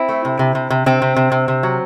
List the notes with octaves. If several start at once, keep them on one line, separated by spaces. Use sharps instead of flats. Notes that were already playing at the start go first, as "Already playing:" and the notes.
Already playing: C4 E4
A3
C3
C3
C3
C3
C3 C4
C3
C3
C3
C3
F#3